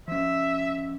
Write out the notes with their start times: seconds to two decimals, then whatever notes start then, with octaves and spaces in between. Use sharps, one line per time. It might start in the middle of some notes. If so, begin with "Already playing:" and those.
0.08 F3 C#4 E5